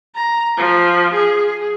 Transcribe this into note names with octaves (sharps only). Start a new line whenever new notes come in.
A#5
F3
G#4